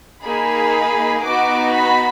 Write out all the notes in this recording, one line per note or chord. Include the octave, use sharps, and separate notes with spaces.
A#3 D#4 G#4 B5
B3 D#4 F#4 D6
B5